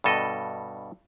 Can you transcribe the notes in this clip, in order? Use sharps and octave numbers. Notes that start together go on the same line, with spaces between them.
G2 B2 A4 D#5